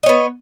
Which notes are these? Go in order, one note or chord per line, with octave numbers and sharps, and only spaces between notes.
B3 C#5 D#5